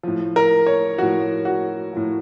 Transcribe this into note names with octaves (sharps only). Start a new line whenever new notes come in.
A2 F3
A#4
C#5
A2 F3 F#4
F#4
A2 F3